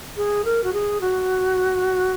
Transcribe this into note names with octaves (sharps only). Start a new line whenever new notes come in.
G#4
A#4
F#4
G#4
F#4